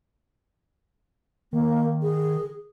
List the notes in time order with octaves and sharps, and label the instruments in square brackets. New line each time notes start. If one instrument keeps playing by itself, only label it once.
[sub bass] D#3 [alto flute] A#3
[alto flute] G#4